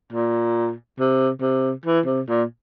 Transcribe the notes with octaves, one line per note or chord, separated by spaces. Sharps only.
A#2
C3
C3
E3
C3
A#2